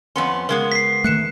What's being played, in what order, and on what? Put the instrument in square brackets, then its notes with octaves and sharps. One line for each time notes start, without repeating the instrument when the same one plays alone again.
[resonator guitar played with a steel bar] F2 B3 C#4 [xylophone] C6
[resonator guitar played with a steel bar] C#3 G#3 B3 [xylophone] A#4
[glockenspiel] B6 C7
[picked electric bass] D#3 A3 [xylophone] F#6 C#7 E7